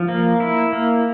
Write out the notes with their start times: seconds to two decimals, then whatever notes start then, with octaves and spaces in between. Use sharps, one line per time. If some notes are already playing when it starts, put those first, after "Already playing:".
Already playing: F3
0.08 A#3
0.40 E4
0.73 A#3